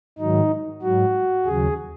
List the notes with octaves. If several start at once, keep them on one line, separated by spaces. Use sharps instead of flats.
G#2 D#3 F#3 D#4
G#2 F#3 F#4
D#2 C#3 F#3 G#4